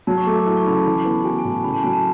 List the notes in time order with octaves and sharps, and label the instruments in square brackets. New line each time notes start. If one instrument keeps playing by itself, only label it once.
[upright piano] F#3 [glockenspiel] A5
[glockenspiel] C#6
[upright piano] A3 [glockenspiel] D6
[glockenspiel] D6
[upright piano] E4 [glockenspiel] C#6
[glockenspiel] C#6
[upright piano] C#3 [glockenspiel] B5
[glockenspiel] A5
[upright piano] E3
B3
[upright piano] F#4 [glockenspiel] G#5
[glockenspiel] G#5
[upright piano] A2
[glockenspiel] A5
[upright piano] C#3 [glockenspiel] B5
[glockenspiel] A5
[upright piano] F#3 [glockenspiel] G#5
[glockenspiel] A5